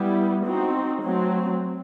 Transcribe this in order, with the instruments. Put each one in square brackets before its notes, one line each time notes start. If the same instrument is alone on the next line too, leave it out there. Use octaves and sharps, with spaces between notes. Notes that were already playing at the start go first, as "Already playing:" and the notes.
Already playing: [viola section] G3 B3 E4
C4 D#4 F#4
F#3 A3 C4